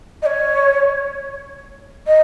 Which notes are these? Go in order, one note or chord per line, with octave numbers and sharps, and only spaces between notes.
D#5
C#5
D#5